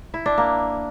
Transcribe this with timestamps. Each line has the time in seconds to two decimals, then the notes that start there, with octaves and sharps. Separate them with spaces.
0.14 E4
0.26 D4
0.38 A#3